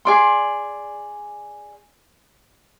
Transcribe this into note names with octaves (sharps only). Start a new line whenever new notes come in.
G#4 D5 C6